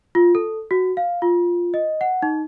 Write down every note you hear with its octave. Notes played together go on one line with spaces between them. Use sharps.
F4
A4
F#4
F5
F4
D#5
F#5
D#4